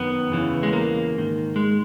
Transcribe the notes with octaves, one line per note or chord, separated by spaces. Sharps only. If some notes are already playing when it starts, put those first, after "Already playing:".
Already playing: F#2 D#3 B3
E2 C#3 E3
G#3
A#3
G#2 D#3
G#3